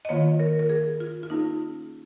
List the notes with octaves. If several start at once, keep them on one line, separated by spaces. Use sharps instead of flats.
D#5
D#3 A#3 F4 C#5
A#4
A#4
G#4
F4
F4
A#3 C#4 D#4 G#4